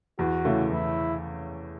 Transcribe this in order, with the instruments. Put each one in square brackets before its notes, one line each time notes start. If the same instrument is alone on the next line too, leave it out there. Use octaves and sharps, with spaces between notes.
[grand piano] E2 [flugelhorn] F#4
[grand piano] C#3 E3 A3
[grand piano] E2 [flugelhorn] E4